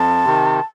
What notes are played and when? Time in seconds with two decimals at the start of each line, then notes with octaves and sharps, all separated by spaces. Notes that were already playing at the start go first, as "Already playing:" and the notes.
Already playing: F2 A5
0.25 C3 D#3